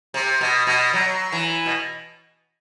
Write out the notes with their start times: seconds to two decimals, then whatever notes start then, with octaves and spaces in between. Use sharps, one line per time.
0.14 C3
0.41 B2
0.67 B2
0.93 F#3
1.32 E3
1.66 B2